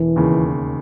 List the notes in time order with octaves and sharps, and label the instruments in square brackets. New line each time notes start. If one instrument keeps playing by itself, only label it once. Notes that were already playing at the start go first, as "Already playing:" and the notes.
Already playing: [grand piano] E1 [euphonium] E3
[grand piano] D#2 C#3